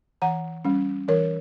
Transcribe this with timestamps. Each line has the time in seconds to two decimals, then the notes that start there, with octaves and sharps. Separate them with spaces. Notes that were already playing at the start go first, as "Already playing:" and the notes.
0.22 E3 F#5 A#5
0.65 G3 C#4
1.08 E3 A#4 C#5